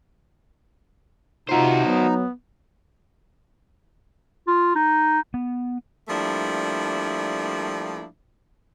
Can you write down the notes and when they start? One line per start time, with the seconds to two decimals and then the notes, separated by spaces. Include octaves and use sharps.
1.49 C3 D#4 F4 F#4 C5
1.85 F#3 B3
4.47 F4
4.75 D#4
5.34 B3
6.09 F3 G3 A3 A#3 D4 E4